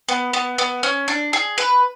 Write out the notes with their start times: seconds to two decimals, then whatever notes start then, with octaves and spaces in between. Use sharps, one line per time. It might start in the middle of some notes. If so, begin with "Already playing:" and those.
0.09 B3
0.33 B3
0.58 B3
0.83 C#4
1.08 D4
1.33 G#4
1.58 B4